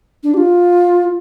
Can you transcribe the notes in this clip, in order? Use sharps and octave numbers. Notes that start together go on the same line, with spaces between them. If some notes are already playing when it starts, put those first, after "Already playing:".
D4
G4
F4